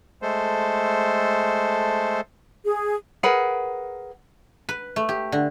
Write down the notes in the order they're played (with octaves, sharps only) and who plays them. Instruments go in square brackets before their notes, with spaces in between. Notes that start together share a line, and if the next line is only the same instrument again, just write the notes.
[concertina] G#3 A3 A4 C5
[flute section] G#4
[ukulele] G#4 A#4 B4 F#5
[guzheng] B4
A3
G4
D3